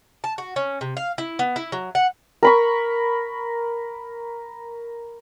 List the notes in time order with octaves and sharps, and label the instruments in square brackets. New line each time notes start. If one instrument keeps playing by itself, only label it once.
[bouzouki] A5
F#4
C#4
C3
F5
E4
B3
E4
F#3
F#5
[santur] A#4 B5 C#6